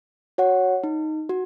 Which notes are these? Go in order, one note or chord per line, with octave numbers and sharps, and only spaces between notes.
F#4 C#5 F#5
D#4
F#4